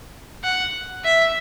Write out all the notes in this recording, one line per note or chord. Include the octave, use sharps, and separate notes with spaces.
F#5
E5